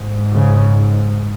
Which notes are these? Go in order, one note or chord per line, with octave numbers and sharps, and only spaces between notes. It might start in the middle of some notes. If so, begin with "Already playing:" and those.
Already playing: G#2
C#3